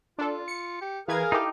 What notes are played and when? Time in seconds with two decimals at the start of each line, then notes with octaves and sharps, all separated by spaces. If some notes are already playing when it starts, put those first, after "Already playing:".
0.18 D4 F4 A4
0.48 C#7
0.81 G4
1.08 E3 G#4 A#4 B4 F5 G#6
1.32 D#4 E4 G4 A4 D6